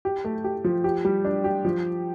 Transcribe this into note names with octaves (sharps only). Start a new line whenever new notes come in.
G4
A3
G4
F3
G4
G3
D4
G4
F3